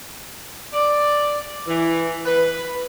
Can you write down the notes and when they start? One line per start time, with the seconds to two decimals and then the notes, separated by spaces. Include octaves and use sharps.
0.73 D5
1.67 E3
2.26 B4